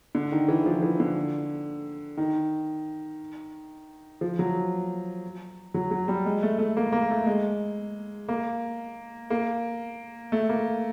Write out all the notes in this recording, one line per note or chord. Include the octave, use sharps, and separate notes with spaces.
D3
D#3
E3
F3
E3
D3
D#3
F3
F#3
F#3
F#3
G3
G#3
A3
A3
A#3
A#3
A3
G#3
A#3
A#3
A3
A#3